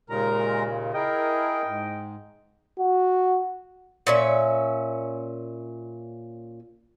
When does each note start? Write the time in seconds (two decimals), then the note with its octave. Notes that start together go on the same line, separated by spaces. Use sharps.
0.10 D#2 A#2 C#3 G#3 A#4 A#5
0.94 E4 G#4 A#4 D#5 G5
1.64 G#2
2.79 F#4
4.07 A#2 C#4 E5